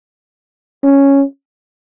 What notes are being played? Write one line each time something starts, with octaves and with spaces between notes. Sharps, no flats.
C#4